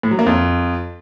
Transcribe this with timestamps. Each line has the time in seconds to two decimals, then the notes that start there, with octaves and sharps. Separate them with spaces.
0.03 A2
0.11 F#3
0.19 A#3
0.26 F2